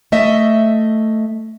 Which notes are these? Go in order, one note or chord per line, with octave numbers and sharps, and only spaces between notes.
A3 D#5 E5